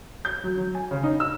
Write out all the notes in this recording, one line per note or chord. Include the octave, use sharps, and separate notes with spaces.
G6
F#3
F#3
G#5
C#3
D#4
E6